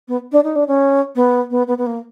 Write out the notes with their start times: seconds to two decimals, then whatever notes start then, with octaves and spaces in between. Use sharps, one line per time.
0.08 B3
0.32 D4
0.44 D#4
0.56 D4
0.68 C#4
1.16 B3
1.50 B3
1.68 B3
1.78 B3
1.86 A#3